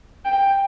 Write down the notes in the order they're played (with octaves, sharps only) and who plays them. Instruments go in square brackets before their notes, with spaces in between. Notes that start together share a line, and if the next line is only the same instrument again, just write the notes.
[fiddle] G5